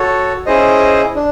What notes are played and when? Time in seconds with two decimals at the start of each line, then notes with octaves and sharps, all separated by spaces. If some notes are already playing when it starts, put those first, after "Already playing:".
Already playing: F#4 A4 C#5
0.46 C#4 E4 G#4 C5 D#5
1.16 D4